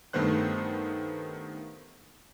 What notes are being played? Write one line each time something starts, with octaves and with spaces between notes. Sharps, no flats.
G2 D#3 A3 B3 C5 F#6